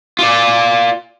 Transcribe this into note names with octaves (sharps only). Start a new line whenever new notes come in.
F4 D5